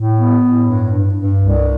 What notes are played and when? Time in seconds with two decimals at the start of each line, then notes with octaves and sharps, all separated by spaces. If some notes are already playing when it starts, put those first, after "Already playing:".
Already playing: A2
0.17 B3
0.42 A2
0.66 G2
0.91 G2
1.15 G2
1.40 C2